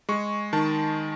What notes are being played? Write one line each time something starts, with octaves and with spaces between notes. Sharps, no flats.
G#3 C#6
D#3 A5